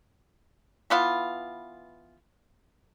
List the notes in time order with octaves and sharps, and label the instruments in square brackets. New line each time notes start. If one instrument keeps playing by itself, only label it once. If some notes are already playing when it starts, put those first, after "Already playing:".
[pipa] E3 B3 F4